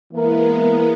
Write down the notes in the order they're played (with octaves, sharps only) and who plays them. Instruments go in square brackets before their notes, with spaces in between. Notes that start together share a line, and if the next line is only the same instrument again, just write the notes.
[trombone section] E3 A#3 E4 A#4 [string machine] G#3 B3